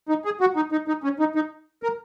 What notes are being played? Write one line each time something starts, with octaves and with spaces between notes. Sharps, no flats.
D#4
G#4
F#4
D#4
D#4
D#4
C#4
D#4
D#4
A#4